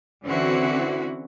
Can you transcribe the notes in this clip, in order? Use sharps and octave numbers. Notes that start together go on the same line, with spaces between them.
D3 E3 C4 C#4 E4 F#4